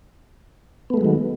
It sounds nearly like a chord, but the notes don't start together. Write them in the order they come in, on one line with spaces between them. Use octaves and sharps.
B3 A3 G#3 F#3 D#3